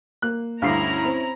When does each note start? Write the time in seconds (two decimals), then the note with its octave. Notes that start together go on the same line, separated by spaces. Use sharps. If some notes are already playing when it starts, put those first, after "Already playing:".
0.22 A#3 F#6
0.62 D2 G2 D3 C#4 E4 F5 A#5 C7
1.05 C4